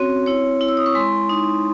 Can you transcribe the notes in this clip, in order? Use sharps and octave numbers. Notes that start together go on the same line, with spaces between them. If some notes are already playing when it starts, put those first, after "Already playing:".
Already playing: C4 C#4 F#4 C#5
E4 C#5
E4
E6
D#6
C#6
G#3 C6
D#4